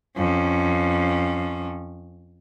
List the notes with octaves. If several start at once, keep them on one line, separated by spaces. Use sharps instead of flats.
F2 C#4